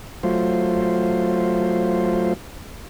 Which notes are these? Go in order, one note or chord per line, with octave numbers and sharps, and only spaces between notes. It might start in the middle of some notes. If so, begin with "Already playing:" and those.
F#3 A3 F4 C5